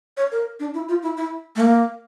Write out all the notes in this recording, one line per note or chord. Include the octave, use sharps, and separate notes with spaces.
C#5
A#4
D4
E4
F4
E4
E4
A3
A#3